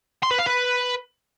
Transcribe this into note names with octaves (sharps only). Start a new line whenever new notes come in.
C6
B4
F5
B4